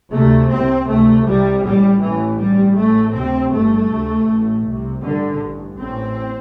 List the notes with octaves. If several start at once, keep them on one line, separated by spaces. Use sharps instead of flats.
D2 C3 A3
C2 C3 C4
D2 C3 A3
C2 C3 G3
A1 A2 G3
A1 A2 E3
A1 G2 G3
A1 A2 A3
D2 C3 C4
G1 G2 A3
D2 C3
A1 A2
C2 C3
A1 G2 D3
A1 G2
A1 A2 C4